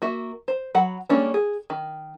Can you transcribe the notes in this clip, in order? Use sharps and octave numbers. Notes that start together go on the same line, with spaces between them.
A#3 F#4 E5
C5
F#3 F#5 B5
G3 G#3 A#3 C#4 D4
G#4
D#3